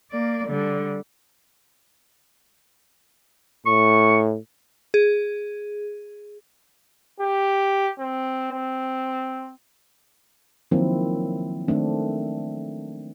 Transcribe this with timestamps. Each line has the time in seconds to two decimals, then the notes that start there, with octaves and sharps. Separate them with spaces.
0.11 A#3 D5
0.48 D3 G3
3.67 A2 C#6
4.94 G#4
7.20 G4
7.99 C4
8.52 C4
10.71 D#3 F3 F#3 A#3 C4 E4
11.68 D#3 A3 C4 D4